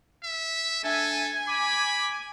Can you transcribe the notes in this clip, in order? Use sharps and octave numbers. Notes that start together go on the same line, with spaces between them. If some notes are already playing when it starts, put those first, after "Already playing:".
E5
D4 A4 E5 G#5
B5 D6